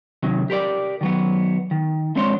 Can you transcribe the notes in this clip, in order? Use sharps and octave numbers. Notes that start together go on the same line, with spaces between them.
C3 D#3 F#3
G4 A#4 C5 D5
D#3 F#3 B3
D#3
F3 G#3 C4 D4 C#5 C6